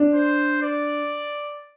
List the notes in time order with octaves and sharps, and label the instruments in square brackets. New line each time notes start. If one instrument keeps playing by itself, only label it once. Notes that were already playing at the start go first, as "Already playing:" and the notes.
Already playing: [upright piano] D4
[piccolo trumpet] C5
D5